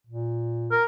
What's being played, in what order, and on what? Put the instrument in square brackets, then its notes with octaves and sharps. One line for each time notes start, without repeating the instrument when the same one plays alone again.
[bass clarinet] A#2
[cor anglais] A#4